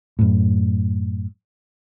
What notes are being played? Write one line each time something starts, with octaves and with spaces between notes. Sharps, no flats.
F#2 A2